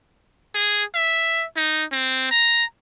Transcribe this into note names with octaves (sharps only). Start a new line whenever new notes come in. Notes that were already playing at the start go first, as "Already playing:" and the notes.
G#4
E5
D#4
C4
A#5